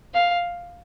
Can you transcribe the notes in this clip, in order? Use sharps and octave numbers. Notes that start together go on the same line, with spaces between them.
F5